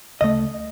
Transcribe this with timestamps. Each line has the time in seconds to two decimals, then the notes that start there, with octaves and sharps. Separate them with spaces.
0.21 D2 C#3 E3 A3 D#5